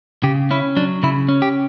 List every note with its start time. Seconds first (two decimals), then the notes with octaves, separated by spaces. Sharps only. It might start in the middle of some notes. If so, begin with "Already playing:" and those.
0.23 C#3 G4
0.51 C#4 E4
0.77 F#3 D4
1.03 C#3 E4
1.29 C#4
1.42 G4